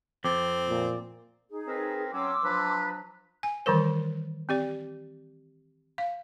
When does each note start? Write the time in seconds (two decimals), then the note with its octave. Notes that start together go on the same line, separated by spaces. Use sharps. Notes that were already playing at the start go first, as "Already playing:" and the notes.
0.24 F2 C4 D6 A6
0.69 A#2
1.49 D#4 G#4
1.68 C4 A#4 B4
2.13 F#3 C4 C#4 C6 D6 E6
2.44 F3 F#3 D4 B4
3.43 G#5
3.66 D#3 E3 G3 A#4 C5
4.49 C4 G4 D5
5.98 F5